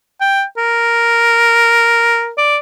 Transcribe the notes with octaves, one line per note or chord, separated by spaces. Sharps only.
G5
A#4
D5